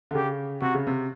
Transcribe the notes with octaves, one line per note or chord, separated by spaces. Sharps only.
D3
C#3 G4
C3 F#4
C#3
C3